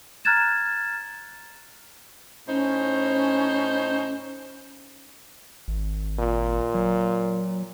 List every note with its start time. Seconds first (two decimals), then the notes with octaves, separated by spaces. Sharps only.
0.25 A#5 F6 F#6 G#6 A6 E7
2.48 A2 C#4 D#4 C5
5.68 G#1
6.19 A#2
6.75 F#3